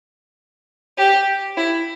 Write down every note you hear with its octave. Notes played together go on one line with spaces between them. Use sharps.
G4
E4